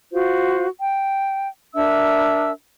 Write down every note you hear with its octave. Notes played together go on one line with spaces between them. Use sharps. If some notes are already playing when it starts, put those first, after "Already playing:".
F4 F#4 C5
G5
D4 A#4 E5 E6